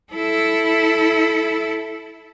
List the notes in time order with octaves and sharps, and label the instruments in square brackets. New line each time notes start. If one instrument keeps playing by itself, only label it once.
[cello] E4 A4